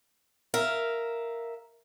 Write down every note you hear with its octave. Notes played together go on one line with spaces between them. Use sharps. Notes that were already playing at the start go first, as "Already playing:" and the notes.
A#4 E5 F5